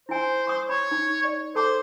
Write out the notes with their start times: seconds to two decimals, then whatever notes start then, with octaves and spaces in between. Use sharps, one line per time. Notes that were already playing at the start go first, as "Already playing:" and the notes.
0.09 E4 C5 G#5
0.47 C#6 D#6
0.69 C#5 B5
0.91 D#4
1.24 D5
1.55 A4 C5 A5 D6